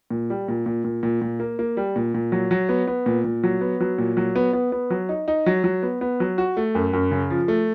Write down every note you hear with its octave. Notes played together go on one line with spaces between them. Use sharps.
A#2
G3
A#2
A#2
A#2
A#2
A#2
A#3
A#3
G3
A#2
A#2
F#3
F#3
B3
B3
A#2
A#2
F#3
B3
F#3
A#2
F#3
B3
B3
B3
F#3
D#4
D#4
F#3
F#3
B3
B3
F#3
F#4
A3
F#2
F#2
C#3
F3
A3